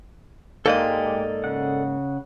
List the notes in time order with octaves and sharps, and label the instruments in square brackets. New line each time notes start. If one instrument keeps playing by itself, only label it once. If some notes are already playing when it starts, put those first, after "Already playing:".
[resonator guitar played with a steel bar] G#2 A#3 [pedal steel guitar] G#3 G4 [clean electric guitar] A4 D5 D#5
[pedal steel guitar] C#3 F#5